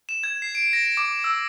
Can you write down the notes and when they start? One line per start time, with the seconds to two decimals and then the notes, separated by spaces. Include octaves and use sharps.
0.09 E7
0.24 G#6
0.42 C7
0.55 D7
0.73 A#6
0.97 D6
1.24 E6